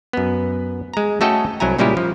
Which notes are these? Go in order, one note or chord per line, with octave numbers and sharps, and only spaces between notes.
F#2 B3
G#3 A#5
A3 C#4 F#4 A4 D#5 G5
C2 F#3 E4 G#5 A#5
A#2 C#3 G3 G#3 E4 G4
F3